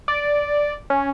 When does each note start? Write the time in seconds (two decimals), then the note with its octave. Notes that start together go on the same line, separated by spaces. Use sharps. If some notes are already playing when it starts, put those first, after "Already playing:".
0.08 D5
0.90 C#4